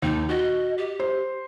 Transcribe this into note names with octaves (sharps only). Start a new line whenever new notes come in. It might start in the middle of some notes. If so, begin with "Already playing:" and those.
D#2 D#4
F#4 D#5
G4
C5